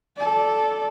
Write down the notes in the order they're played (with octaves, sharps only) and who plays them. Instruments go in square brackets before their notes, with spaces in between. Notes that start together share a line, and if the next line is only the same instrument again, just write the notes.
[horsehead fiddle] A4 D5